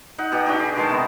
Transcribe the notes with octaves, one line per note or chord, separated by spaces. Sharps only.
D#4 F#5
B2 G4
D4 D#4 F#4 G4
G#4
B2 D#3 G#3 A5
C3 B3